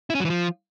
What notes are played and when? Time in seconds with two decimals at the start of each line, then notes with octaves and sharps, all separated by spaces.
0.10 E4
0.15 C#4
0.20 F#3
0.25 E3
0.30 F3